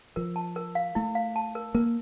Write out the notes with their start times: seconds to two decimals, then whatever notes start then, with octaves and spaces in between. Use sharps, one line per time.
0.16 F3 A#4
0.36 A5
0.56 A#4
0.75 F5
0.95 A3 E4
1.15 F5
1.36 A5
1.55 A#4
1.75 A#3 A#4